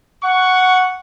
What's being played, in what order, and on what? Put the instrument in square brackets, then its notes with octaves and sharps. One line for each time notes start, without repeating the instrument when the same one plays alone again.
[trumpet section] F#5 C#6